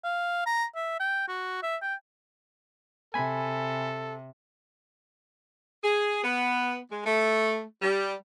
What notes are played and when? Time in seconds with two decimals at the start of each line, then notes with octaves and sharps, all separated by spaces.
0.04 F5
0.46 A#5
0.76 E5
1.00 G5
1.28 F#4
1.63 E5
1.82 G5
3.14 C3 A4 G#5 B5
5.83 G#4
6.24 B3
6.91 G#3
7.05 A3
7.81 G3